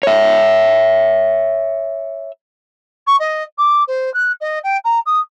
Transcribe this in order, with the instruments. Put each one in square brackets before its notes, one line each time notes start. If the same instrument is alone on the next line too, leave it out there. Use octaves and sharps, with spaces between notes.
[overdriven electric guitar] C#5 E5
[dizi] C#6
D#5
D6
C5
F#6
D#5
G5
A#5
D#6